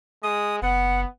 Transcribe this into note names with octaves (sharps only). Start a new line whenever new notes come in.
G#3 D#6
F#1 B3 F#5